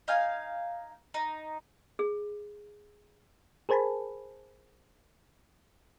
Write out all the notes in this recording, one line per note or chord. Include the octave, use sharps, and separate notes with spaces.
D#4 F5 G#5
D#4
G#4
G#4 A#4 C5 G#5 A5 B5